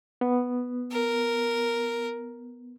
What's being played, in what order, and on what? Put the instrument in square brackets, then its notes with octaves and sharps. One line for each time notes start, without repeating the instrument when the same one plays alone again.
[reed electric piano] B3
[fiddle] A#4